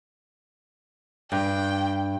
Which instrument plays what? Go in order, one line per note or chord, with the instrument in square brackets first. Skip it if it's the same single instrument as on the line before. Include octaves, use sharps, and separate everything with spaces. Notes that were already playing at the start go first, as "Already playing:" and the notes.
[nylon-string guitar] G2 [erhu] G5